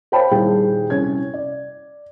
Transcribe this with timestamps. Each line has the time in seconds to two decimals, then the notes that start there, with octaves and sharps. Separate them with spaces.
0.12 C5 C#5 F5 G5 A5 B5
0.31 D#1 G3 E4 G#4 G5
0.90 C2 C#4 G#6
1.34 D5